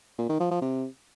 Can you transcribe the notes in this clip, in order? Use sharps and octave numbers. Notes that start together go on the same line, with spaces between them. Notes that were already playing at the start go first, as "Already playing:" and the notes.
A#2
D#3
F3
F3
C3